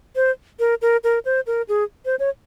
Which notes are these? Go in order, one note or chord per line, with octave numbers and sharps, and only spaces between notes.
C5
A#4
A#4
A#4
C5
A#4
G#4
C5
C#5